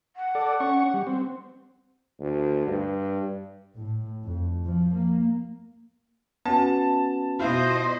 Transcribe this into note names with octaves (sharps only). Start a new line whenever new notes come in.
F#5
A4 D5
C#4 C#6
G3
C4
D2
G2
A2
F2
F3
A#3
B3 C#4 F#4 A5
B2 E4 F4 C5 D#5